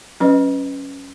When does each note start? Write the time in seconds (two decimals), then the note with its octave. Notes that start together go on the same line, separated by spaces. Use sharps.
0.20 F#3 C#4 B4 D#5